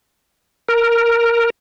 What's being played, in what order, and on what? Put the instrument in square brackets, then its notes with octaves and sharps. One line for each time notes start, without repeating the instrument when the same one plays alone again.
[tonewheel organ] A#4